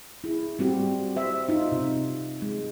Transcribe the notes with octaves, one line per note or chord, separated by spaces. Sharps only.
E4 G#4
G3 C4 F#4 G4
C5 E5
D#4 F4
C3
G#3